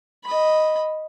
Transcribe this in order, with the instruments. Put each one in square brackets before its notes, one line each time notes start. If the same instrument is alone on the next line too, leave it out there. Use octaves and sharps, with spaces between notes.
[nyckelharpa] D#5 B5